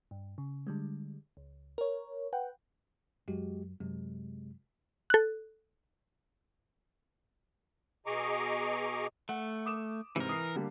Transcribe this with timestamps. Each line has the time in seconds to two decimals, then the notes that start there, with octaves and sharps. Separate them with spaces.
0.11 G2
0.38 C#3
0.67 D3 G3 G#3
1.37 C#2
1.78 A#4 C#5
2.33 B4 F#5 G5
3.28 F#2 G#3 F#4 G4
3.80 F#2 C3 G#3
5.10 A4 F#6
8.06 B2 G#4 D#5 A#5 C#6 D6
9.29 A3 F#5
9.66 D6 D#6 E7
10.16 G#2 C3 E3 C4 A#4
10.29 D#6 C7
10.55 D3 G3 A#3